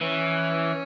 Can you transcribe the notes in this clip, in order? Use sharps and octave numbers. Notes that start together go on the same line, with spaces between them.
E3 C#4